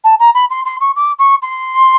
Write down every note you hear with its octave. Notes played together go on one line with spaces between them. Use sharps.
A5
A#5
B5
C6
C6
C#6
D6
C#6
C6